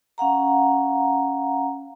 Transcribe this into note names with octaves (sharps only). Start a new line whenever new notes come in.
C#4 F5 F#5 A#5